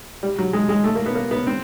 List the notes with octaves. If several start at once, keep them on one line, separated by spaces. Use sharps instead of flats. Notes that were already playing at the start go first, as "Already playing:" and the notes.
G3
F#3
G#3
G#3
A3
A#3
B3
A#3
B3
C4